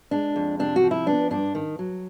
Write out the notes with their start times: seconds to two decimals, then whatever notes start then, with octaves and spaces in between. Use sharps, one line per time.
0.11 G#3 D4
0.36 F2
0.59 C3 D4
0.76 F#4
0.84 F3
0.91 E4
1.07 B3 D4
1.31 G2 D4
1.55 D#3
1.79 F#3